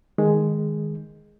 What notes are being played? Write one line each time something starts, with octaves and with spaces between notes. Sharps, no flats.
D#3 G#3